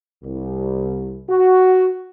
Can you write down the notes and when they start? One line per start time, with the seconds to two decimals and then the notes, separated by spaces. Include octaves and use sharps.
0.24 C2
1.29 F#4